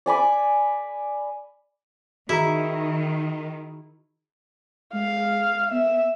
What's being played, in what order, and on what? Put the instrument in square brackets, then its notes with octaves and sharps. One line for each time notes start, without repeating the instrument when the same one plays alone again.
[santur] D5 G#5 B5 D6
[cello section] D#3 [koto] E4 [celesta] F#4 G#4 A#5
[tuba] G#3 [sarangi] F5
[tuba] B3 [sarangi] E5